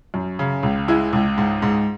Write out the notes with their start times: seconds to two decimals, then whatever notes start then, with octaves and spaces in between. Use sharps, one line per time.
0.14 F#2
0.39 C#3
0.63 C#2
0.88 G#3 E4
1.13 C#2
1.38 G#2
1.62 G#2